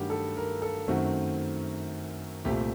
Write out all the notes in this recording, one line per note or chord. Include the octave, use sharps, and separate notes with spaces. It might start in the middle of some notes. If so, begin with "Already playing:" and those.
Already playing: G2 D#3 F#3 A3 F#4 G4 A#4
A4
A#4
A4
F#2 D#3 A3 C4 F#4
C2 A#2 A3 C4 G4